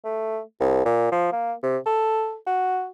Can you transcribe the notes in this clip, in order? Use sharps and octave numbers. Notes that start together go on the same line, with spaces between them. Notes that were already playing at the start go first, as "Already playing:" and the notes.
A3
C2
A#2
F3
A#3
C3
A4
F#4